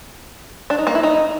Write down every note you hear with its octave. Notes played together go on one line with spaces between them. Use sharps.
D4
D#4
A#3
E4
D#4